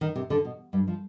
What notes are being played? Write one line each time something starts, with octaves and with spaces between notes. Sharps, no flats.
D#3
C3
D3
B2
G2
F3